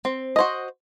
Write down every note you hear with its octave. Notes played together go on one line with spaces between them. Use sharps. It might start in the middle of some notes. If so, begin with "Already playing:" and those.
C4
F#4 C5 D#5